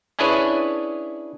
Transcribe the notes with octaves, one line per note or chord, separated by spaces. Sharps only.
C#4 D4 E4 G#4 B4 C#5